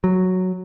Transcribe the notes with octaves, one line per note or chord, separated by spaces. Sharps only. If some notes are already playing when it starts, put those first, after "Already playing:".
F#3